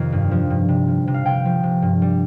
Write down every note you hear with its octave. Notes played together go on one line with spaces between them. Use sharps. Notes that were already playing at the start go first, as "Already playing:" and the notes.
Already playing: F2 C3 D#3
G2
F3
G2
C3
F3
C3
F5
C3 G5
F3
C3
G2
G3